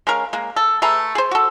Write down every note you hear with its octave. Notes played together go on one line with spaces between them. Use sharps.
G#3 C#4 A#4 F5
G#3 A#3
A4
A3 G#4 B4 A#5
G#4 C5
F#4 A4